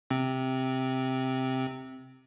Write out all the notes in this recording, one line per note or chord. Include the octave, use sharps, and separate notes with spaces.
C3 C4